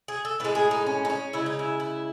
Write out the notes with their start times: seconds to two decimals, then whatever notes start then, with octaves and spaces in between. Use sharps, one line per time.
0.08 G#4
0.25 A4
0.40 A2 G#3 B4
0.55 G#4
0.71 D#4
0.86 C#4
1.05 D#4
1.10 C#4
1.33 C#3 G#3 E4
1.46 D#4
1.59 E4
1.80 E4